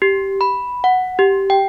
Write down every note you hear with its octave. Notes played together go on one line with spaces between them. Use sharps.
G4
B5
F#5
G4
G5